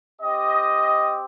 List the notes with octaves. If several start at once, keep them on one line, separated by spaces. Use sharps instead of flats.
C4 G4 D#5